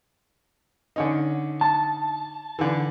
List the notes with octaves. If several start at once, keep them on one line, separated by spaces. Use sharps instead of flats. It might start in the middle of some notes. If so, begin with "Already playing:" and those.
D3 C#4 D#4
A5
D3 E3